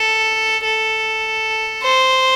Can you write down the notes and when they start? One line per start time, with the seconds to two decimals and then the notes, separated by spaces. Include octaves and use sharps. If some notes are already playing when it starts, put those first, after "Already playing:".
Already playing: A4
0.64 A4
1.83 C5